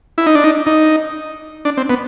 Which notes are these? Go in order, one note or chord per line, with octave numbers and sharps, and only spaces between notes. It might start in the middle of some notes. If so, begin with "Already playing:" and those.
E4
D#4
D4
D#4
D#4
D4
C4
B3